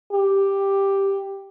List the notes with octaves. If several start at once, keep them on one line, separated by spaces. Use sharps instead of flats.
G4